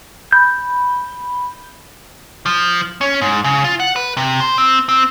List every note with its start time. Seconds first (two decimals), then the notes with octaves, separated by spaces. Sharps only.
0.32 B5 G6
2.46 F3
3.01 C#4
3.21 G#2
3.44 C#3
3.64 F4
3.80 F#5
3.96 B4
4.17 C3
4.40 C5
4.58 C4
4.89 C4